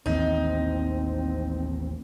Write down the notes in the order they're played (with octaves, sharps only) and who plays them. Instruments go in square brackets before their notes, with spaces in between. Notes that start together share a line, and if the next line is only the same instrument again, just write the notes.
[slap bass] A1 D#2 E3 [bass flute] C4 [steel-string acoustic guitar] D#4